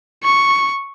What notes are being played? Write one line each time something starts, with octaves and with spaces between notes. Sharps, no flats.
C#6